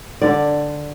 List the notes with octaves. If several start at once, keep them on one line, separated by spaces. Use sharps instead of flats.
D3 D5